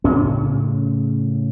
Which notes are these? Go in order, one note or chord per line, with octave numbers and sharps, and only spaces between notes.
A2 C#3 C#4